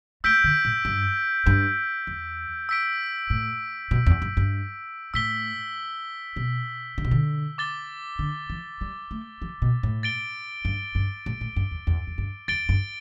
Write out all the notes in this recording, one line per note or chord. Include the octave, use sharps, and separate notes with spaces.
A3 E6 G6 B6 D7 G7
D3
A2
G2
G2
E2
E6 B6 D7
A2
B2
E2
G2
G2
A2 E6 B6 G7
B2
D3
B2
D3
D6 A6 G7
D3
E3
G3
A3
E3
B2
A2
A6 D7 G7
G2
G2
A2
A2
G2
E2
E2
E2
G2
E2 A6 D7 G7
G2